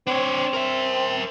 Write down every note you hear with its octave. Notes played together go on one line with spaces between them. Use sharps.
C4 D4 C#5
A#4 E5